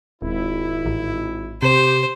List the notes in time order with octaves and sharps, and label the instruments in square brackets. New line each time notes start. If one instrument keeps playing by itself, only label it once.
[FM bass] D#1 [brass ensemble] G#1 E4
[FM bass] A1
[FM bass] C3 [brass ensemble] G4 [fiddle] C5